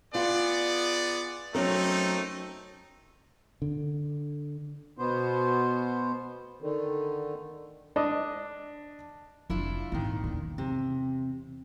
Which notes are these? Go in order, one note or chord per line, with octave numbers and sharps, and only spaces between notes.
B3 F4 G#4 D5
F#3 A3 C4 C#4 D#4 A#4
D3
B2 B3 C5
D3 D#3
D4 D#5
F1 D4 E4 F4
G#1 A#2 D#3
E2 C#3
C3